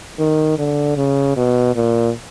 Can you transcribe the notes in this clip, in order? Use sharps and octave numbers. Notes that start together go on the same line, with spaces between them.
D#3
D3
C#3
B2
A#2